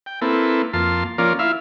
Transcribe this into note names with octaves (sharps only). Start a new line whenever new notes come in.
G5
A#3 C4 E4 A4 B4
F2 A#3 F4 A5 C6
F3 A#3 C#4 F4 A#4 D5
E4 F4 E5 F5